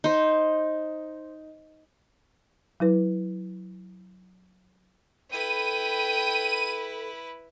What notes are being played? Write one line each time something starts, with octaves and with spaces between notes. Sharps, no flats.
D#4 C5
F#3 E4 B4
E4 A4 B4 G5 D#7